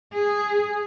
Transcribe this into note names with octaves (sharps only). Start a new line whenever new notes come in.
G#4